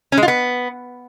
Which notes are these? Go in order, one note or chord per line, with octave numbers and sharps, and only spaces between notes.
C#4
G#3
F4
B3